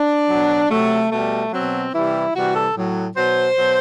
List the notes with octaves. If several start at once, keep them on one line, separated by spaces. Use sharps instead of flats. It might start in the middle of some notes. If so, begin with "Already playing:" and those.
Already playing: D4
B2 F#3
C3 F#3 A3
B2 G3 A3
B2 F#3 C4
C3 E3 G3 E4
C3 E3 G3 F#4
A4
A2 F#3
B2 F#3 C5
B2 F#3